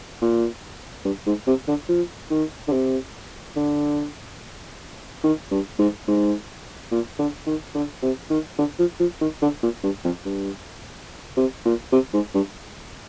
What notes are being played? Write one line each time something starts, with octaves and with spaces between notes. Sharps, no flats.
A#2
G2
G#2
C3
D3
F3
D#3
D3
C3
D3
D#3
G2
G#2
G#2
A#2
D3
D#3
D3
C3
D#3
D3
F3
F3
D#3
D3
A#2
G2
F2
G2
C3
A#2
C3
G#2
G2